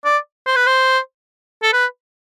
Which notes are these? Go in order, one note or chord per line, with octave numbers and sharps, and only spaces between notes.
D5
C5
B4
C5
A4
B4